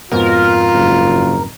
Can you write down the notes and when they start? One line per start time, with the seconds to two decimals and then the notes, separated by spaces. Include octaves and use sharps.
0.12 F2 G#2 B2 F4 A#4
0.73 F#1